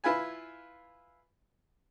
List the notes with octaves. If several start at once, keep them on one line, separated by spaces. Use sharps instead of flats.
E4 F4 B4 G#5